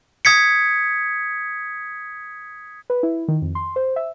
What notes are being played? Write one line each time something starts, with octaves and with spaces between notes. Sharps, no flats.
D#6 G#6 B6 C#7
B4
E4
D#3
F2
C6
C5
E5